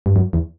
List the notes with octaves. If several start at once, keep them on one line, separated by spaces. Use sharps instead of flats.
G2
F#2
E2